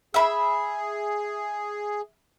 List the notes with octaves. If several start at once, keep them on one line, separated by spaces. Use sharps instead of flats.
G#4 E5 B5